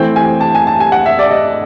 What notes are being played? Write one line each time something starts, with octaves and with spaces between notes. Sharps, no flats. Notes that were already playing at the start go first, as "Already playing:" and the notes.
Already playing: E3 A3 C4 G5
G#5
A5
G#5
A5
G#5
F#5
E5
D5
D#5